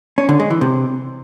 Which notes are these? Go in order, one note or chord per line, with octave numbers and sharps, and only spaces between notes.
C#4
D3
G#3
E3
C3